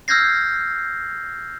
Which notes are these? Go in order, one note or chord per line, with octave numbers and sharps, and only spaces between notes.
E6 F6 G6 G#6 A#6 C7